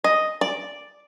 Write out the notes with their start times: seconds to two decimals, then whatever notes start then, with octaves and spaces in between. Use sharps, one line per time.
0.04 D#5
0.41 D5